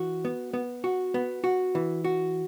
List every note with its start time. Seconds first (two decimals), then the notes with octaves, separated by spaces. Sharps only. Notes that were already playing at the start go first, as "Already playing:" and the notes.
Already playing: E3 F#4
0.25 B3
0.53 B3
0.84 F#4
1.14 B3
1.44 F#4
1.75 E3
2.04 F#4